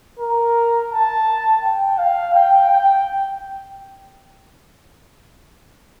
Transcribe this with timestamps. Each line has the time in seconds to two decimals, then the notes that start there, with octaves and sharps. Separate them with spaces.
0.19 A#4
0.92 A5
1.63 G5
1.98 F5
2.35 G5
2.71 G5